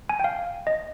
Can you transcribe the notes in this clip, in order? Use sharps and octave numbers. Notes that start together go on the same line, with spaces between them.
G#5
G5
F5
D#5